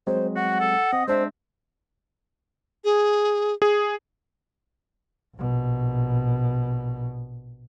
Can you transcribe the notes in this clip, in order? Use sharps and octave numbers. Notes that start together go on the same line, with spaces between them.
F#3 G#3 C4 C5
F#4 F#5
A4
C4 D#5
G#3 C4 D4 C5 E5
G#4
G#4
A#1 B2